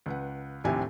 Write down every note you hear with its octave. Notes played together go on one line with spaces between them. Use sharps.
C#2 B4 F#5
A#1 D#2 A2 C3 G4 G#5